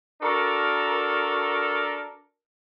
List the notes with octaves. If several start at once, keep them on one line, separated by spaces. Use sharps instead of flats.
D4 F#4 A4 A#4